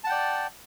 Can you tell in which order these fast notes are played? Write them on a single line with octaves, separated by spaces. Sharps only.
A5 F#5 G5 D5